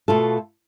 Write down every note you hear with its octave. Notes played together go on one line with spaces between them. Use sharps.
B2 A3 F4 A4